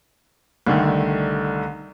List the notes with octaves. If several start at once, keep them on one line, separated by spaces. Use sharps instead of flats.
C2 D3 D#3 A3